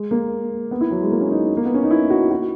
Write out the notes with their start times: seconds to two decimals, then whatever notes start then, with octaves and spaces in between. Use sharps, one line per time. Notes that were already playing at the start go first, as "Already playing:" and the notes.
Already playing: G#3
0.11 A#3
0.71 B3
0.81 E4
0.91 F#3
1.02 G#3
1.12 A#3
1.21 C#4
1.31 D#4
1.57 A#3
1.65 B3
1.74 C#4
1.83 D#4
1.91 E4
2.10 F#4
2.31 F#4